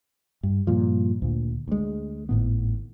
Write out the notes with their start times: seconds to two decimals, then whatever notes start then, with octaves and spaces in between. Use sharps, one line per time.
0.43 G2
0.67 G2 A#2 F3
1.22 D2 A#2
1.68 D2 G#3
2.29 G#1 A2 B3